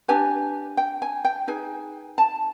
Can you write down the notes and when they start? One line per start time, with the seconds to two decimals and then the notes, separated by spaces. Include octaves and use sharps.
0.08 D4 G4 B4 G#5
0.77 G5
1.02 G#5
1.25 G5
1.47 D#4 G#4 B4 G#5
2.18 A5